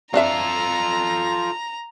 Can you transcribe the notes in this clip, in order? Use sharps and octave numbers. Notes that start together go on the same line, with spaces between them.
C4 D4 F4 A4 E5 A#5